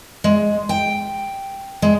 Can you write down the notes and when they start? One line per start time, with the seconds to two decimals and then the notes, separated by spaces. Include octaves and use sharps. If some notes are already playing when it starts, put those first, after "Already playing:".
0.24 G#3
0.69 G5
1.82 G#3